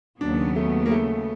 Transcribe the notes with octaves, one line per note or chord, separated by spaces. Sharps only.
D#2 C#3 F#3 B3 D4
A3
A#3
A3